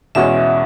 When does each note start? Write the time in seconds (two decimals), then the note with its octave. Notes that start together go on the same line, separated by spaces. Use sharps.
0.15 E2 B2 G#3 C#4 F#4 E5